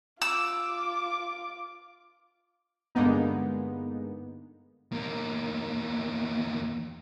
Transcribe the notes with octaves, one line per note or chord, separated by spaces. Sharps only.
F4 D6 E6
G2 D3 G#3 A#3 B3 D#4
E2 A#3